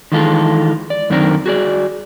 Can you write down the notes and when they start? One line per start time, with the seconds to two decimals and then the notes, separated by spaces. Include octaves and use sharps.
0.12 D#3 E3 G#3 F4 A4
0.90 D5
1.10 F#2 D3 D#3 C4 D4 A#4
1.46 F#4 G#4 D5